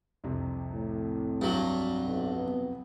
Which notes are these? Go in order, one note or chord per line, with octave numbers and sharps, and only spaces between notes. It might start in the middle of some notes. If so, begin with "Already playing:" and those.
C2 F2 C3
A2
G2 F#3
B1
B3